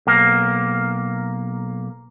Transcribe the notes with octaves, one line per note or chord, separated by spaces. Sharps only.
B1 A#3